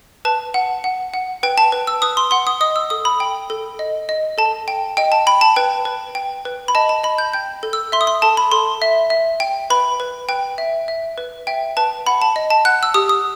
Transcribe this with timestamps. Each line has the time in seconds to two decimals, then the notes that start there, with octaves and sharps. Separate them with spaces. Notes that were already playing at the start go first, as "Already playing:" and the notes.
0.25 B4 A5
0.54 F#5
0.84 F#5
1.14 F#5
1.43 B4 G5
1.58 A5
1.72 B4
1.87 E6
2.02 B4 D#6
2.17 C6
2.31 F#5 C6
2.47 D#6
2.61 D#5 D#6
2.76 E6
2.90 A4 D#6
3.05 B5
3.20 G5
3.50 A4
3.79 D#5
4.09 D#5
4.38 A4 A5
4.68 G5
4.97 D#5 G5
5.12 A5
5.27 G5 B5
5.41 A5
5.56 B4 G5
5.85 B4
6.15 G5
6.45 B4
6.68 B5
6.75 D#5 A5
6.89 A5
7.03 D#5 B5
7.18 G6
7.33 G5 G6
7.63 A4
7.73 E6
7.92 E5 C6
8.01 D#6
8.07 C6
8.22 A4 A5
8.37 B5
8.52 A4 C6
8.82 E5
9.10 E5
9.40 G5
9.70 B4 B5
10.00 B4
10.29 B4 G5
10.58 E5
10.88 E5
11.18 B4
11.47 E5 G5
11.77 B4 A5
12.06 F#5 B5
12.22 A5
12.36 D#5
12.50 A5
12.65 F#5 F#6
12.83 E6
12.94 G4 D#6
13.09 D#6